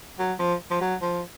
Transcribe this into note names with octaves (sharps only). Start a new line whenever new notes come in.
F#3
F3
F3
F#3
F3